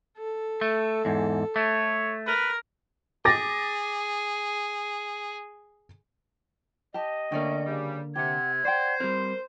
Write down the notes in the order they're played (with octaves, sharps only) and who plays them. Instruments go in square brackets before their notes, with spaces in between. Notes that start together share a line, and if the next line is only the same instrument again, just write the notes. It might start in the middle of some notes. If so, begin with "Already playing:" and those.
[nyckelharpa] A4
[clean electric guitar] A3
E2 G#2
[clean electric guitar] A3 [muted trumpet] C#5
[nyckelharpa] A#4 [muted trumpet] B4
[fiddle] G#4 [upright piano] D6 A6 A#6
[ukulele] G4 A5 [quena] D#5
[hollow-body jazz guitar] D3 A#3 [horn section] A3 C#4 [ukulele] D5 G5
[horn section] C#3 G3
[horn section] C3 [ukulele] G4 F#5 [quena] G#6
[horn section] C5 [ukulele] D5 F#5 G5
[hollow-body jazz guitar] G3 C4 [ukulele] A#4